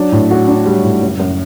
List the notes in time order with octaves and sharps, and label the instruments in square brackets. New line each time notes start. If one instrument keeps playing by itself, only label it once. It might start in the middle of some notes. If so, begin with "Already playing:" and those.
Already playing: [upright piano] F#3 D4
A2
F#4
D4
G3
A2
F#1
F#2